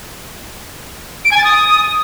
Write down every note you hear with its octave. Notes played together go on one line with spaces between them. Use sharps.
D7
G#5
A6
D#6